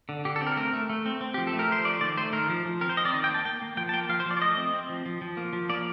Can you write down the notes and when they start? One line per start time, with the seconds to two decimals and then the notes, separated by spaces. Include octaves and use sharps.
0.09 D3
0.25 D3 G4
0.36 A4
0.41 C4
0.47 A#4
0.57 A3 A#4
0.73 A3
0.90 A3
1.06 C4
1.21 C4
1.34 F3 G4
1.47 A4
1.53 A3
1.59 A#4
1.69 F3 C5
1.85 A3 D5
2.01 D#3 D5
2.17 A3 C5
2.33 D#3 A#4
2.49 F3
2.65 F3
2.81 C4 A#4
2.89 C5
2.97 C4 D#5
3.05 D5
3.13 D#3 D#5
3.24 G5
3.29 A#3
3.34 A5
3.45 A#3 G5
3.62 A#3
3.77 F3 G5
3.89 A5
3.93 A#3 G5
4.09 F3 F5
4.20 C5
4.26 F3 D5
4.37 D5
4.41 A3 D#5
4.57 C4
4.73 C4
4.89 F3
5.06 F3
5.21 F3
5.37 A#3
5.53 F3
5.69 A#3 D5